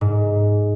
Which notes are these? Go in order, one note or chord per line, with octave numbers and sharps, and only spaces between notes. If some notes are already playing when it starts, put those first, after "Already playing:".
G#2